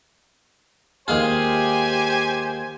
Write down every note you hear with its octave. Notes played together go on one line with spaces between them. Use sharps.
D#2 G#3 F4 G4 C5 G#5